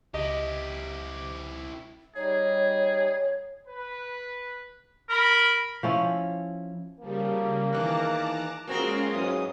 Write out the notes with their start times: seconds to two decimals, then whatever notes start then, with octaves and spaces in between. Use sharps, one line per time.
0.14 C#2 E4 G4 D#5
2.16 G3 D#4 G#4 C#5
3.66 B4
5.09 A#4 B5
5.83 F3 C#4 E4
7.00 C#3 F3 G3 A#3
7.73 E2 A2 D#3 E3 A5 A#5 D6 F#6
8.67 G#3 A#3 C4 C#4 F4 F#4 G#4 A#4
9.12 G#2 E3 F#3 D#6